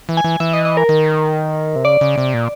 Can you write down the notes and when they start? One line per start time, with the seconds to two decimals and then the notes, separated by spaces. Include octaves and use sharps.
0.09 E3
0.17 G#5
0.24 E3
0.40 E3 E5
0.53 D#5
0.65 D#5
0.77 A#4
0.89 D#3
1.76 C3
1.85 C#3 D5
2.01 C#3
2.18 C3
2.34 A#2